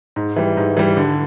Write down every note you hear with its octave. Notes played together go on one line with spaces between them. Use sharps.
G#2
E3 G3
G#2
E3 G3
D3